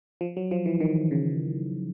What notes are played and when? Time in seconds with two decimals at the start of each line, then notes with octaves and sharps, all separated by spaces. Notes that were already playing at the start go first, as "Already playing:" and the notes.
0.21 F3
0.37 F#3
0.51 F3
0.66 E3
0.80 D#3
1.11 C#3